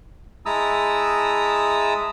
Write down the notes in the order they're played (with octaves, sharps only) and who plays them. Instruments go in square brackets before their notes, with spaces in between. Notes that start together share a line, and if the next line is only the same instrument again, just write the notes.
[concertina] G#3 E4 A5 A#5 D#6 E6